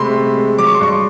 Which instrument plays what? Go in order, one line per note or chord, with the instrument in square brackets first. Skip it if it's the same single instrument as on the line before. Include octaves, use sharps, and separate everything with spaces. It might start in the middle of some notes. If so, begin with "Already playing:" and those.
Already playing: [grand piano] C3 G#3 A3 B5 C6
G#3
G#3
F#3 D6
C#6
C6
G2 C#6